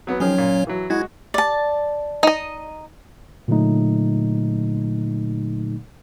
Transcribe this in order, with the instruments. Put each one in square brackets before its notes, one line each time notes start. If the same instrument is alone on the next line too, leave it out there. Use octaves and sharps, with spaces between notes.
[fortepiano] F#3 B3
[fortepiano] D#3 F3 G#4 [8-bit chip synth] F#3 C#4 C#5
[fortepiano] A#2
E3 F#3
[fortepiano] G#3 F#4 [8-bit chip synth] E4 G#6
[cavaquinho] D5 A5
[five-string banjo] D#4 D#5
[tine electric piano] A#2 D3 F#3 A3 D#4